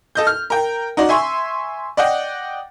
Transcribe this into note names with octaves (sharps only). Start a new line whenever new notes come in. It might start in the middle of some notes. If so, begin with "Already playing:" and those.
A4 D#5 G6
F6
A#4 G5
D#4 F#4 D5
E5 G#5 C6 C#6 E6
D5 D#5 F#5 G5